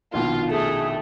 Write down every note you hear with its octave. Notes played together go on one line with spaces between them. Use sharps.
A#1 B2 D#3 F4
A3 G#4